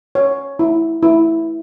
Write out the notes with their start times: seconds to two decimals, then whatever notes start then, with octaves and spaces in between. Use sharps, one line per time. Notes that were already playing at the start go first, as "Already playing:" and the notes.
0.15 C#5
0.59 E4
1.03 E4